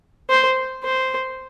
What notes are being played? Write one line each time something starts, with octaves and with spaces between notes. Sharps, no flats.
C5
C5